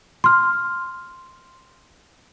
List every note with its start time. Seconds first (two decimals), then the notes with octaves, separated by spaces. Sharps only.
0.24 C6 F6